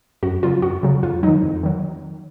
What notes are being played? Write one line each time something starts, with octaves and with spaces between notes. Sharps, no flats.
F#2 F#4
C#3 F#3 F4
F#2 F#4
C#3 F#3
F2 F4
D#3 F#3 D#4
F2
D#3 F#3